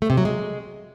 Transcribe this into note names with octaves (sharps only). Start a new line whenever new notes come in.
A3
C3
F#3
G#3